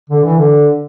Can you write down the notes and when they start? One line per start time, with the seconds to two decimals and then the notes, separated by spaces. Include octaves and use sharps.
0.10 D3
0.23 E3
0.37 D3